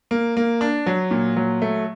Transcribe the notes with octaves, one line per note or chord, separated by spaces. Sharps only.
A#3
A#3
D4
F#3
A#2
F#3
A3